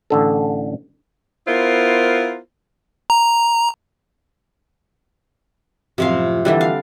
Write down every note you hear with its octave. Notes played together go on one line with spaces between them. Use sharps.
A1 D3 A4
B3 E4 F4 A#4 C5
A#5
F#2 A2 C3 F3 C4 F5
D3 E3 G3 C4 E5
F5